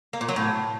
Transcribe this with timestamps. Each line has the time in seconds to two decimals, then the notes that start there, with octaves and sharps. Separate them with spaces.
0.13 A#3
0.21 A#2
0.29 F#3
0.36 A2